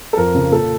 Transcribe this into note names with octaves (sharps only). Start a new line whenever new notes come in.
A4
F2 A#4
C#3 F3
A#2 A4